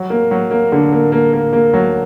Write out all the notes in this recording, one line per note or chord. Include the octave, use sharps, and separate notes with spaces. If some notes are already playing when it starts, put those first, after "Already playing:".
Already playing: F#3
A#3
F#3
A#3
D3
A#3
A#3
A#3
A#3
F#3